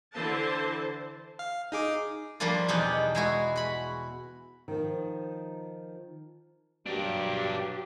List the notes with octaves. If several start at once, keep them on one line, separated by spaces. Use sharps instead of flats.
D3 E3 C5 A5
F5
D#4 G#4 D6
F3 G3 A#3 D4 F4
E2 B2 D#4 G4 F#5
G#3 E4 F#4
F#4 B5
D#3 F3
G2 F#3 D4 G4 A#4